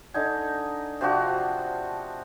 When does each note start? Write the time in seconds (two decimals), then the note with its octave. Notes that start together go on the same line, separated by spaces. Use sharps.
0.14 D3 D#4 G#5
1.01 C3 F3 D4 F#4